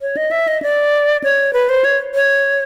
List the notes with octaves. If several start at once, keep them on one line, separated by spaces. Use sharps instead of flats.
C#5
D#5
E5
D#5
D5
C#5
B4
C5
C#5
C#5